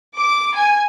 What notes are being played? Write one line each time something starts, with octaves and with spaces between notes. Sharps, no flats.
D6
G#5